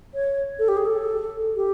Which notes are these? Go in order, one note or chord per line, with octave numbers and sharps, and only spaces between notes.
C#5
A4
G4
G#4
A4
G4